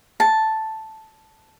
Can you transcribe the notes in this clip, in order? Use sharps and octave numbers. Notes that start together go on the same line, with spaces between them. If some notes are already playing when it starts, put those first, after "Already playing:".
A5